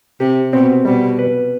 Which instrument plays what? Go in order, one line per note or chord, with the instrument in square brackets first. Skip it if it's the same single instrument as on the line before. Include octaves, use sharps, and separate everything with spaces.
[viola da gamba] C3 [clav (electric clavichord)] G4
[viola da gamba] B2 [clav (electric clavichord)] C4
[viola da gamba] B2 [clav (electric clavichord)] G3
[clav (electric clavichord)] B4